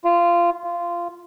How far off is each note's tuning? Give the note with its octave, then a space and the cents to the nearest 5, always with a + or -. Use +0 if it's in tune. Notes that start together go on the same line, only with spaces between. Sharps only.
F4 -15
F4 -15